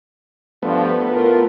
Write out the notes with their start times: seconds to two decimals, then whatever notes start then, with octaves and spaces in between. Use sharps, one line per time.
0.63 G2 F3 A3 B3
1.10 A2 F4 A#4